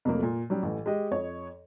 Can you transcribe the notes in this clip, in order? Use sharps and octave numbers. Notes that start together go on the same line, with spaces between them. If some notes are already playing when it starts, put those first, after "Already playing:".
F2 C3 F#3 A3 A#3
A#2
F#3 G3 C#4 G4
A1 A2 E3
G#3 G4 D#5
F2 C#5 D#5